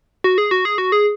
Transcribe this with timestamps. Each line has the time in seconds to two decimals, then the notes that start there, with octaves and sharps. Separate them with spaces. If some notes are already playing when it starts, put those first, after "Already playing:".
0.24 F#4
0.38 G#4
0.51 F#4
0.65 G#4
0.78 F#4
0.92 G#4